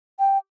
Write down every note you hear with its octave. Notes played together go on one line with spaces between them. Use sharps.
G5